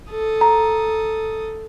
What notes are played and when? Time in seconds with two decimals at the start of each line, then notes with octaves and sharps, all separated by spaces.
0.11 A4 D#6
0.41 A#5